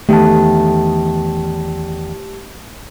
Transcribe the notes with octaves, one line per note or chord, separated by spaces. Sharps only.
E2 D#3 A3 G4 A5